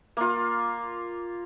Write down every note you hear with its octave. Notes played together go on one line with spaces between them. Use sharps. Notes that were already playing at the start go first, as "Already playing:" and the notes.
A#3 F4